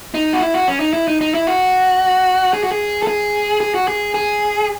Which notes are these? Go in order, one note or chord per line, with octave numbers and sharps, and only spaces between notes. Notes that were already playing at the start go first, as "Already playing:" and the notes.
D#4
F#4
E4
F#4
C#4
D#4
E4
D#4
D#4
E4
F#4
G#4
F#4
G#4
A4
G#4
G#4
F#4
G#4
G#4